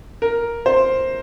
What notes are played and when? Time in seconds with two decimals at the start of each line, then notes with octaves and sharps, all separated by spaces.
0.22 A#4
0.66 C5